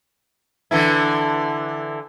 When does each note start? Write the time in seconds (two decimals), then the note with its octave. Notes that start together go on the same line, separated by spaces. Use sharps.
0.71 D3 E3 E4